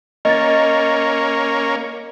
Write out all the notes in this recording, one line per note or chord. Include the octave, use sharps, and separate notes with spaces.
A#3 C#4 D#5 A6